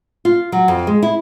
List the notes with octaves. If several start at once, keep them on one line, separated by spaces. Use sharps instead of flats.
F4
F#3
F2
G#3
E4